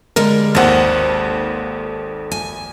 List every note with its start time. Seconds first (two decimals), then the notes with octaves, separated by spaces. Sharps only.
0.16 D3 G3 G#3 A#4
0.55 G#1 D#2 A4 C5 F#5
2.32 G#5